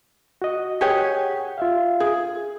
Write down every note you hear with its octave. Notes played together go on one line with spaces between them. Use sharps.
F#4 D#5
G4 G#4 C#5 F#5 G#5 C#6
F4 E5 F5
G#4